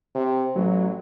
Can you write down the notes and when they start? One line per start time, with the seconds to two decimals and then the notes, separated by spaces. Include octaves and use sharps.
0.15 C3
0.56 A1 F#3